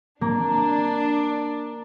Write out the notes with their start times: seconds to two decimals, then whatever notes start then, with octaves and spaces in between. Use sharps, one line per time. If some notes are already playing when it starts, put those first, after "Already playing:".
0.21 A#3 D4